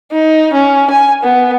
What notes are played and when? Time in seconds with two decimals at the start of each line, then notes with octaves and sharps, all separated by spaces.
0.12 D#4
0.53 C#4
0.90 G#5
1.23 B3